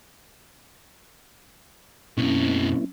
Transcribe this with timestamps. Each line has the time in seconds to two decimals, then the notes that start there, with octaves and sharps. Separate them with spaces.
2.17 F#2 B2 A#3 C4 C#4 E4